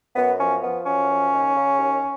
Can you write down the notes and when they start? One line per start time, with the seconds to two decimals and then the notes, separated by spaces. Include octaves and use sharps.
0.16 F#2 B3
0.39 F3 C#4
0.63 F3 B3
0.86 F#2 C#4
1.09 F3
1.33 D#2
1.55 C#3
1.78 D#2